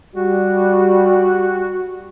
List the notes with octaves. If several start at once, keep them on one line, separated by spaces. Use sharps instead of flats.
G3 F#4